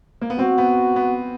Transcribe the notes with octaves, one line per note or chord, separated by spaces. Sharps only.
A#3
B3
C4 F#4
B3
B3